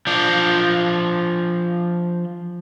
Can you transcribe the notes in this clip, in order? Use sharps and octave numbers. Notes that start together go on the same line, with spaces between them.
F3 D4